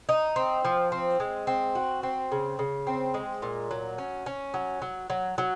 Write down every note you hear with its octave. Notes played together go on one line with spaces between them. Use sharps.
D#4
C4
F3
C4
G#3
C4
F#4
C4
C#3
C#3
C4
G#3
A#2
F#3
C#4
C#4
F#3
F#3
F#3
F#3